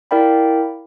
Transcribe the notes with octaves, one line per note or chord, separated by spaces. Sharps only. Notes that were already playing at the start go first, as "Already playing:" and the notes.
E4 A#4 D5 F5 G5 B5